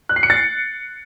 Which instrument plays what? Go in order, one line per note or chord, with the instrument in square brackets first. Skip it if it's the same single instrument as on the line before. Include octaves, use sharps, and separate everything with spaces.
[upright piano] F#6
C7
C#7
A6